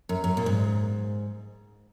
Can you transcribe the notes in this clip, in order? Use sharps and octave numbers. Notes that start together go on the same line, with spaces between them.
F#2
F#2
A#2
G#2